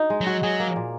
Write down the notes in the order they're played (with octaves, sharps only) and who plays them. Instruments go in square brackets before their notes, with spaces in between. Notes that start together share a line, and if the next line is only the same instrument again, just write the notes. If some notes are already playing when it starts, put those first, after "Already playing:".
Already playing: [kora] D#4 F#4
G#3
[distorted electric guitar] F#3
[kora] F#4
[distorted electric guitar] F#3 [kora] G#4
[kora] A#3
A#2